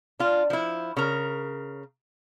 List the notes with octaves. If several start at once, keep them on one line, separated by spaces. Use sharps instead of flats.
D4 F4
F3 E4
C#3 A#4